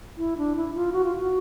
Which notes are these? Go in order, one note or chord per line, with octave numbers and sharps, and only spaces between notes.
E4
D4
E4
F4
F#4
F4
F#4